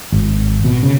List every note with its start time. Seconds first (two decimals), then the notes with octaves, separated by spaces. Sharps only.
0.12 G#1
0.65 B2
0.83 C#3